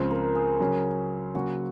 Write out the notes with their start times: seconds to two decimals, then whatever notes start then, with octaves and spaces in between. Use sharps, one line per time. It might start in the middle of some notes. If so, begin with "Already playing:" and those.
Already playing: C#2 C#3 F3 G#3 C4 C5
0.11 A#4
0.35 G#4
0.60 C#3 F#3 C#4
1.34 C#3 F#3 A#3 F#4